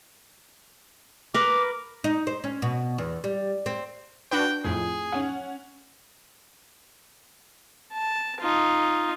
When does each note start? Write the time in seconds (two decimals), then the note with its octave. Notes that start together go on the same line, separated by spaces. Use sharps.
1.34 A#4 B4 D6
2.04 D#4
2.27 C5
2.44 C#4
2.62 B2
2.98 E2
3.24 G3
3.66 C4
4.31 D4 F#4 B4 G5
4.64 F2 A2 G#4
5.12 C#4 F#5
7.93 A5
8.41 D#4 F4